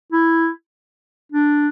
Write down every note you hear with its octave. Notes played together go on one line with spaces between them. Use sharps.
E4
D4